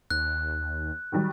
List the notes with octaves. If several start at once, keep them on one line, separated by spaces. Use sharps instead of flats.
D#2 F#6
D#3 F#3 G3